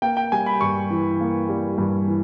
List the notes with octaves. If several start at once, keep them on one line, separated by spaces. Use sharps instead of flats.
A#3 G5
G5
G3 G#5
B5
G2 C#6
E3
A#3
G3
G2
E3